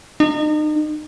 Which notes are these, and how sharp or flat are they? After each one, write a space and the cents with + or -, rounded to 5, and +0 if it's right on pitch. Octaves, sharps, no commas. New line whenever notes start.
D#4 -35